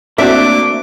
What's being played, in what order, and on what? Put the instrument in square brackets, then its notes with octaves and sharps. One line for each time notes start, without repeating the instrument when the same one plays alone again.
[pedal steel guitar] A3 A#3 D4 [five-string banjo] C4 F#4 [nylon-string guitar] E5 [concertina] D6